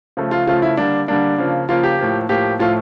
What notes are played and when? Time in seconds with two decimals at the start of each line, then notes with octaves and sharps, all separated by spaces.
0.17 C#3 F3 A3
0.31 F4
0.46 C#3 F3 A3 F4
0.62 E4
0.77 D3 G3 A#3 D4
1.08 D3 G3 A#3 D4
1.38 C#3 F3 A#3
1.69 C#3 F3 A#3 F4
1.83 G4
1.99 A2 F3 A#3
2.29 A2 F3 A#3 G4
2.59 A2 F3 A3 F4